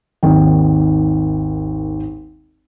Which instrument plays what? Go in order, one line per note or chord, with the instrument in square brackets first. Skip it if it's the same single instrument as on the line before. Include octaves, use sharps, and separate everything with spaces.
[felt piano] G#1 D#2 G5